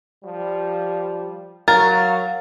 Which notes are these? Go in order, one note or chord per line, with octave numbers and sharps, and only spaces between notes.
F3 G3
F#3 A#4 F5 A6